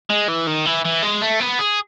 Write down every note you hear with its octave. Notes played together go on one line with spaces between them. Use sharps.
G#3
E3
D#3
E3
E3
G#3
A3
B3
G#4